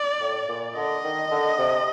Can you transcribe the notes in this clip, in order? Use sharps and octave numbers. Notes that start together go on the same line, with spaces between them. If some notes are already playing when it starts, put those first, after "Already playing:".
Already playing: D5
A2
A#2
D3 D#5
D#3
D3
C3